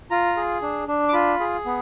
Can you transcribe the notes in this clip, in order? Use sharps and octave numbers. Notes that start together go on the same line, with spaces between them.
F4 A#5
G#4
D4
D4
D6
F4 B5
G#4
B3